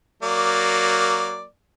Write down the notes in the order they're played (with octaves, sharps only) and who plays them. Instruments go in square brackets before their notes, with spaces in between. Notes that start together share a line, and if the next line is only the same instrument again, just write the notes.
[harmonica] F#3 A#3 D5